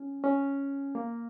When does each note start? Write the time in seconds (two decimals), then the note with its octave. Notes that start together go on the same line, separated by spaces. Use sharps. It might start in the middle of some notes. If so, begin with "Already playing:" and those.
Already playing: C#4
0.24 C#4
0.95 A#3